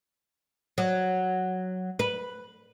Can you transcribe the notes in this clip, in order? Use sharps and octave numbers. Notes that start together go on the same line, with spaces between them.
F#3
B4